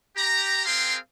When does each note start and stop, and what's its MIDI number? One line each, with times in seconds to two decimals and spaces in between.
0.15 0.64 67
0.15 0.64 82
0.65 0.96 60
0.65 0.96 68
0.65 0.96 70
0.65 0.96 77
0.65 0.96 79
0.65 0.96 84